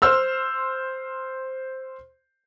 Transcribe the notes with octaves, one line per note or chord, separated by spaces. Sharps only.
C5 C6 E6 F6